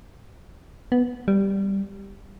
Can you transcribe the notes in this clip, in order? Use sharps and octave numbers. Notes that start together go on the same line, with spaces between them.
B3
G3